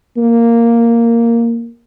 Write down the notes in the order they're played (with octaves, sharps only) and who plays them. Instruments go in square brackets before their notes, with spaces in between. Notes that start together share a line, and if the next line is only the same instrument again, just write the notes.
[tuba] A#3